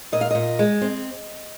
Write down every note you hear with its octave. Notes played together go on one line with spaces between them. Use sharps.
A#2 D#5
F5
A#2 D#5
G#3
C4